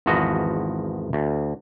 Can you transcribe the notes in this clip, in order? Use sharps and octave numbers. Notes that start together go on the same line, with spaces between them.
G#1 E2 F3 F#4 B4 D#5
D2